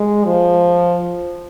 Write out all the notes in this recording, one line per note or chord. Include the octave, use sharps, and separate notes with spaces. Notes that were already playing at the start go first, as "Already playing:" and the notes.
Already playing: G#3
F3